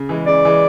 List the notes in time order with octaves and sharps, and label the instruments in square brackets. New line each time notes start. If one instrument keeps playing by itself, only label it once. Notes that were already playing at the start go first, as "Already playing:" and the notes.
Already playing: [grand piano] C#3
E3 G#3
[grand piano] C#3 [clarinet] D5
[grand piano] E3 G#3